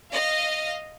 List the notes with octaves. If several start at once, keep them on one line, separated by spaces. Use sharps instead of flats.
D#5 F5